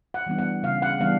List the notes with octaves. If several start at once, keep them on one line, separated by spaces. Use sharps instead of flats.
F#5
E3 G3 B3 D4
F#5
C#3 F5
F#5
E3 G3 B3 D4 F5